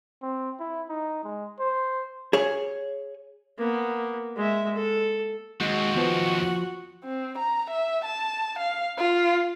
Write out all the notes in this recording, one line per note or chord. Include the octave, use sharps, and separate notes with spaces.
C4
E4
D#4
G#3
C5
G#4 C#5
A#3 B3
G#3 E5
A4
D#2 G#3 C4 F#4
F3 B3 F4 B4
C4
A#5
E5
A5
F5
F4